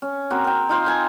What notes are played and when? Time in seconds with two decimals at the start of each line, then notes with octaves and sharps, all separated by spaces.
0.02 C#4
0.30 A#3 C4 F#4
0.44 A#4 G5
0.69 D#4 F4 C5
0.85 A4 C5 G#5 A#5